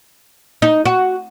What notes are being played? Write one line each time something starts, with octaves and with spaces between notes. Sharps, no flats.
D#4
F#4